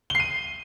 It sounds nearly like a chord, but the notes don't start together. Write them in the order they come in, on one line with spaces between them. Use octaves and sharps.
G7 C7 D#7